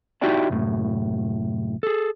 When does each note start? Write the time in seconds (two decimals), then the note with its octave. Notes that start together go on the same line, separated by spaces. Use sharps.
0.21 D#4 E4 F#4 G4 D5 A5
0.49 C2 F#2 A2
1.83 G#4 A4